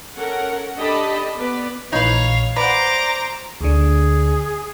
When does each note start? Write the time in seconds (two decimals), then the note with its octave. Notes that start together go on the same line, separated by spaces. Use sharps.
0.15 C#4 A4 A#4 F#5
0.76 D4 G4 A4 D#5 A5 B5
1.37 B3 B4 D5
1.92 A#1 A#2 E3 D#4 B4 C#5 F5
2.56 B4 C5 D5 F#5 A#5 D6
3.61 D2 D3 G#4